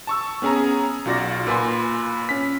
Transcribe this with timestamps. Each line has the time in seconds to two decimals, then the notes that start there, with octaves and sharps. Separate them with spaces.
0.07 A5 C#6 E6
0.42 B3 C#4 G#4 G#5 A#5
1.05 B1 F4 F#4 D5 A#6
1.47 A#2 B4 G#5 C6
2.29 C#4 B6